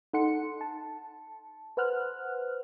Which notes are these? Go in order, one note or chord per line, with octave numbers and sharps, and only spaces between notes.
D#4 A4 F#5 C6 C#7
A5
B4 C5 F#5 F6 F#6